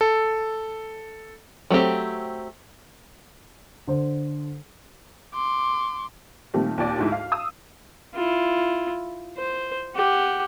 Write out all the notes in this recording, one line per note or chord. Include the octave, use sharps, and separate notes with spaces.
A4
F#3 A3 C4 G4
D3 C5
C6 D6
A#2 D#3 G3 A3 C4
D#2 A#2 D5 D6
D2 G#2 E4
F5
F5 D#6 E6
E4 F4
C5
G4 F#5